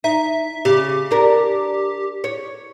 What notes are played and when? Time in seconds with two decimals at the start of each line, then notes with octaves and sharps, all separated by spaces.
0.04 D#4 E5
0.65 C#3 G4
1.11 D4 A#4
2.24 C#5